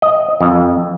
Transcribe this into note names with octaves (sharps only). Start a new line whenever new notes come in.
D#5
F2